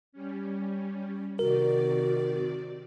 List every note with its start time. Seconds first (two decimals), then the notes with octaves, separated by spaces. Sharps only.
0.12 G3 C#4
1.39 C3 D#3 F#4 A#4 D5